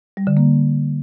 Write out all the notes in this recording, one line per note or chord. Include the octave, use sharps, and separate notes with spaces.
G3
D3
A#3